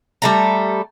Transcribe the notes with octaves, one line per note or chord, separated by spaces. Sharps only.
G3 A3 A#5